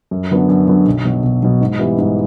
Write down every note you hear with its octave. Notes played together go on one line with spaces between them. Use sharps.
F#2
D3 F#3 B3 D4
F#2
D3 F#3 B3 D4
B1
B2 F#3
B1
B2 F#3
G#2
E3 G3 B3 E4
G#2